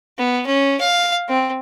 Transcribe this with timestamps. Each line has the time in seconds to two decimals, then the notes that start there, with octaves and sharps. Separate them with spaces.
0.18 B3
0.46 C#4
0.80 F5
1.28 C4